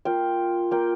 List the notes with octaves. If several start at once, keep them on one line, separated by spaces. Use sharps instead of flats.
A#3 F4 G5
A#3 F4 G5